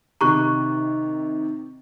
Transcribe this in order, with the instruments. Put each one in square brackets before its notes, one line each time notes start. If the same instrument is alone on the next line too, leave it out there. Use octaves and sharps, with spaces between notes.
[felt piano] C3 D#3 G4 [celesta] A#5 C#6 F#6